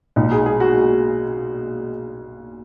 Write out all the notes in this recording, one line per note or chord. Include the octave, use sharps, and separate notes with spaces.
B1 A#2 D#4
G#4
G#4
F#4